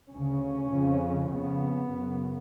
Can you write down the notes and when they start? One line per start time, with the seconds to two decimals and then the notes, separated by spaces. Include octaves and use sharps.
0.12 D2 C#3 C#4
0.71 F2 C#3
1.30 F2 C#3 B3
1.90 F#2 C#3